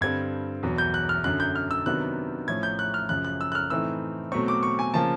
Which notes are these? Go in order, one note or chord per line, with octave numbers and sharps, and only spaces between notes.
G2 D3 G3 C4 G#6
E2 B2 F#3
G6
F#6
F6
F#2 D3 F#3 F#6
G6
F6
E6
C3 D#3 F#3 B3 D4 F#6
A2 F3 A3 C#4 G#6
G6
F#6
F6
F#2 C#3 F3 F#6
F#6
E6
F#6
F6
A2 E3 A3 C4 D#4 E6
B2 F#3 A3 C4 C#6
D6
C#6
G#5
C#3 F3 A#3 A5